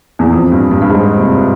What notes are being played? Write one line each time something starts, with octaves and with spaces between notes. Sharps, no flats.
E2
F2
G2
G2
G2
G#2
C3